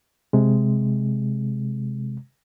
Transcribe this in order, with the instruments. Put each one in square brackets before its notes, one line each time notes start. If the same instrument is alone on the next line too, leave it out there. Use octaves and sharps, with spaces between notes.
[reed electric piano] C3 G#3